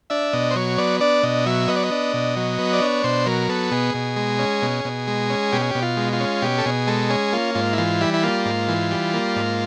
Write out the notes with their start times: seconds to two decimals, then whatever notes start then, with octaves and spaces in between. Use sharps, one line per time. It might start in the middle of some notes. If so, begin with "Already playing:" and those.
0.10 D4 E5
0.33 B2 D#5
0.51 C5
0.56 F#3 C#5
0.78 B3 D5
1.00 D4 D5
1.23 B2 D#5
1.46 F#3 E5
1.68 B3 D#5
1.76 D5
1.84 D#5
1.91 D4
2.14 B2
2.37 F#3
2.58 B3
2.73 D5
2.82 D4 C#5
3.04 B2 C5
3.26 F#3 A#4
3.49 B3 A4
3.71 B2 G#4
3.95 B2
4.16 G#3
4.39 C#4
4.62 B2
4.85 B2
5.08 G#3
5.30 C#4
5.52 B2 G4
5.61 G#4
5.71 B2 G4
5.82 F4
5.97 G#3
6.13 F4
6.20 C#4
6.42 B2 G4
6.58 A4
6.65 B2 G#4
6.87 G#3 A4
7.10 C#4 G#4
7.33 A#3 F4
7.55 G#2 F4
7.73 E4
7.78 E3 F4
8.01 G3 E4
8.14 E4
8.23 A#3 F4
8.45 G#2
8.69 E3
8.91 G3
9.14 A#3
9.36 G#2